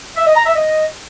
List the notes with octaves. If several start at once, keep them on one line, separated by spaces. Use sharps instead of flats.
E5
D#5
A#5
E5
D#5